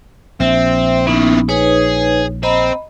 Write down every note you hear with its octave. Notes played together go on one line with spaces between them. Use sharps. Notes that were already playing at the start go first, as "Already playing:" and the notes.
A#1 C4 E5
D#3 B3 C#4 D#4 E4
D#4 G#4 B4 C#5
C4 D#5 A#5 B5